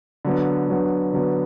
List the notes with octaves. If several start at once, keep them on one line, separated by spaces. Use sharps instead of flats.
D3 F#3 B3
D3 F#3 B3
D3 F#3 B3